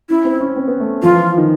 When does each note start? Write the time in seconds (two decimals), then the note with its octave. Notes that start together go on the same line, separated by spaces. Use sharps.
0.09 C#4 E4
0.25 C4
0.41 C#4
0.57 C4
0.68 B3
0.80 A3
1.02 F3 F4
1.14 E3
1.37 D#3